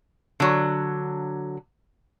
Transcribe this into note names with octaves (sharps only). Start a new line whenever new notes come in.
D3 F#3